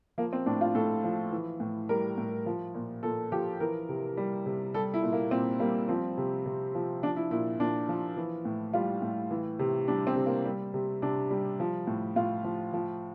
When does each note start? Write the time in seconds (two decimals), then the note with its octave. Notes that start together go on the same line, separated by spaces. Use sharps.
0.18 F3 A#3
0.33 C4
0.46 A2 D4
0.61 F4
0.75 A2 A4
1.04 F3
1.32 E3
1.60 A2
1.89 G3 A#4
2.18 A2
2.46 F3
2.75 A#2
3.03 A#2 A4
3.32 F3 G4
3.60 E3 A#4
3.89 C3
4.17 G3
4.46 C3
4.74 G3 A4
4.94 E4
5.03 A#2
5.13 A#3
5.31 A#2 C4
5.60 G3 A#3
5.89 F3 C4
6.18 C3
6.46 C3
6.75 F3
7.03 F3 D4
7.16 E4
7.31 A#2 E4
7.60 A#2 D4
7.89 F3
8.17 E3
8.45 A2
8.73 G3 F4
9.02 A2
9.31 E3
9.59 C3
9.88 G3 D4
10.07 C4
10.16 C3
10.26 A#3
10.45 G3
10.74 C3
11.02 C3 D4
11.31 G3
11.60 F3
11.87 A2
12.16 A2 F4
12.44 F3
12.73 F3